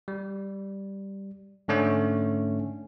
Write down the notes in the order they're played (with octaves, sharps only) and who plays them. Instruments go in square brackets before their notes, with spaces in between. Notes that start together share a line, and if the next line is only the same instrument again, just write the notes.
[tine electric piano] G3
G#2 D3 A3 C#4